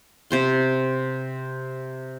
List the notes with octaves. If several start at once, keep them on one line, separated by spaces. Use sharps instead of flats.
C3 C5 C6